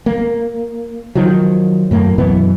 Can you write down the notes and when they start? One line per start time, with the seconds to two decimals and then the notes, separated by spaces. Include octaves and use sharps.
0.06 A#3
1.15 D#3 F3 F#3
1.91 F#2 A2 A#3
2.18 F#2 B2 E3 B3